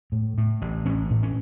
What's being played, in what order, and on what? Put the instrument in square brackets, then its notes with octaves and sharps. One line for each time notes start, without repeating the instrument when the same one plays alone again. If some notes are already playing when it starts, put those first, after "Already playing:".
[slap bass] A2
A2
A1
A1 C#4
A2
C#4